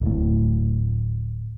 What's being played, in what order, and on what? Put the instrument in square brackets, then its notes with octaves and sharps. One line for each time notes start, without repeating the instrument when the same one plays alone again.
[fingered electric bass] D1 A2